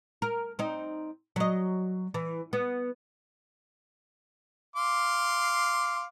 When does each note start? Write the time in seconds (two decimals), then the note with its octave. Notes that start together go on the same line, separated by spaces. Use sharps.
0.22 A#4
0.59 C4 D#4
1.36 F#3 D#5
2.14 E3
2.53 B3
4.76 F5 C6 D6